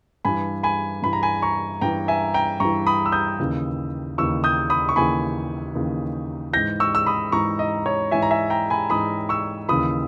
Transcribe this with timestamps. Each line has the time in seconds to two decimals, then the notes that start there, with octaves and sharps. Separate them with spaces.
0.25 G2 E3 G#5 B5
0.63 G#5 B5
1.03 G2 E3 B5
1.13 A#5
1.23 G#5 B5
1.42 A#5 C#6
1.81 G2 E3 G5 A#5
2.08 E5 G#5
2.34 G5 A#5
2.60 G2 E3 A#5 C#6
2.87 B5 D#6
3.06 E6
3.12 D#6 G6
3.39 D#2 C#3 E3
4.18 D#2 C#3 E3 C#6 E6
4.44 D#6 G6
4.70 B5 D#6
4.89 C#6
4.96 D#2 C#3 E3 G#5 B5
5.75 D#2 C#3 E3
6.53 G#2 E3 G6 A#6
6.80 C#6 E6
6.95 E6
7.06 B5 D#6
7.32 G#2 E3 A#5 C#6
7.59 D#5
7.86 C#5
8.11 G#2 E3 E5 G#5
8.22 A#5
8.31 E5 G#5
8.50 G5 A#5
8.70 G#5 B5
8.90 G#2 E3 B5 D#6
9.29 C#6 E6
9.69 D#2 C#3 E3 B5 D#6